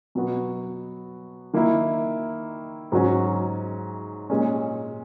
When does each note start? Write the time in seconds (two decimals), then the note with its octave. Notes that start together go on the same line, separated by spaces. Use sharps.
0.15 B2 F#3 B3 F#4
1.54 D#3 A#3 E4
2.92 G#2 F#3 C#4 F#4
4.30 A#2 G#3 C#4